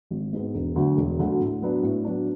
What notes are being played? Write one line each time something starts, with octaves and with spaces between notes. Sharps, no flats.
G#1
G#2 G#3 B3
E1
D2 D3 F#3
E1
D2 D3 F#3
A2
F#3 B3 D4
A2
F#3 B3 D4